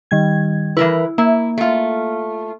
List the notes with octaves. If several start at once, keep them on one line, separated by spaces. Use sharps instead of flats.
D#3 G3 G#6
E3 E4 A#4 B4
A#3 E4
A3 F4